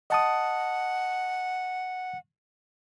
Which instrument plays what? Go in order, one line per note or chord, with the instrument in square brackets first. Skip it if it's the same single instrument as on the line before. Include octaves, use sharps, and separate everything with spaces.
[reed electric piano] D#5 A5 D#6 [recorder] F#5